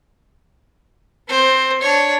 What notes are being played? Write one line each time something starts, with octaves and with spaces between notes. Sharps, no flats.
C4 C5
D4 C#5